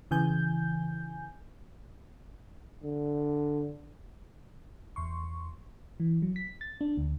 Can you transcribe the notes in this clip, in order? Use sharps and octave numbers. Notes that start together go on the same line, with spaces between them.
C#3 E3 G#5 G6
D3
E2 C6 C#6
E3
F#3
B6
A6
D4
D2